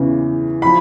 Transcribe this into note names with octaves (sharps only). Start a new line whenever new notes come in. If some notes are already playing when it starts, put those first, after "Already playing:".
Already playing: E2 C#3 E3
F3 B5